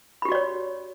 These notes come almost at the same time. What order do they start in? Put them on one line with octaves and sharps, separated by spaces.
B5 G4 F#4 D5 C#5